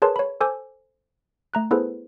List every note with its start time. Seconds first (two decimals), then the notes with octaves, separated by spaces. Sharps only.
0.02 G#4 A#4 B4 C#5 A5 C6
0.16 C#5 B5
0.41 A4 C5 G#5 D6 E6 G6
1.54 A3 A#5 F#6
1.71 B3 E4 G#4 A4 B4 C5